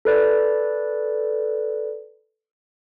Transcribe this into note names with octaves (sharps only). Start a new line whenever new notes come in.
A4 B4 D5